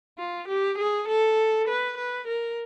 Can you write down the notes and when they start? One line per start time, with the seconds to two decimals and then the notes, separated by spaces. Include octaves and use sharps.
0.18 F4
0.48 G4
0.78 G#4
1.08 A4
1.68 B4
1.97 B4
2.27 A#4